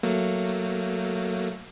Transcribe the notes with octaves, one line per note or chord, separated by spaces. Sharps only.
F#3 A3 A#3